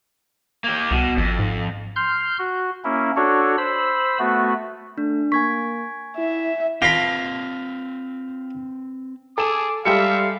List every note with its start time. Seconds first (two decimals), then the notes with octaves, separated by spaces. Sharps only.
0.64 A#3 G4
0.91 C2 B2
1.17 G#1 F2
1.39 G#2
1.96 C6 F6 G6
2.39 F#4
2.84 A#3 C#4 E4
3.16 D4 F#4 A4 C#5
3.58 C5 B5 E6
4.19 A3 B3 F#4
4.98 A3 D4
5.32 A#3 G#5 C#6 G#6 B6
6.18 E4 E5
6.82 C4 F4 B4 A5 B5 A#6 C7 D7
9.38 G#4 A4 D6 E7
9.85 G3 G#3 G4 A4 E5 F5 C#7